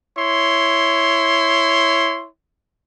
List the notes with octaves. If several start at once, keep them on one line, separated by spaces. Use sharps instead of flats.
E4 C#5 C6